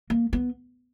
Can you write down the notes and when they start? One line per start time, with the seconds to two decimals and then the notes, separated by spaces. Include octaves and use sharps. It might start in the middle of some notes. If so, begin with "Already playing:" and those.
0.10 A#3
0.33 B3